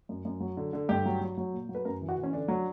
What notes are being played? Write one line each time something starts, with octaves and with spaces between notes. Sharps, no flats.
F#2
F#2
F#3
D3
D3
G2 G4
F#3
F#3
F#3
A#2
F#3
B4
F#2 A#4
E3
F#4
E3
C#4
D3 D4
F#3